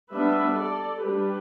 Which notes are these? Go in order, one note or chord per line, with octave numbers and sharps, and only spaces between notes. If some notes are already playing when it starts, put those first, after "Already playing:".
G3 B3 D4 B4 E5
A4 D5
G3 D4 G4 B4